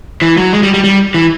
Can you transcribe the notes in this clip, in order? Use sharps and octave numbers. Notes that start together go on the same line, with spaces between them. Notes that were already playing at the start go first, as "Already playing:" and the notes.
E3
F#3
G#3
G3
G3
G3
E3